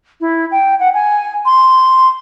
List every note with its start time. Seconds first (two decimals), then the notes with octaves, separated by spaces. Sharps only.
0.21 E4
0.51 G5
0.80 F#5
0.94 G#5
1.45 C6